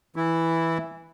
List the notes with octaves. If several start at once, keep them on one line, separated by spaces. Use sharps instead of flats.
E3 E4